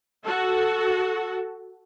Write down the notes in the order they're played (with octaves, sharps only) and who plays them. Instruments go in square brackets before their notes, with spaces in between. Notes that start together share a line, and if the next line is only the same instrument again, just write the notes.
[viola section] F#4 A4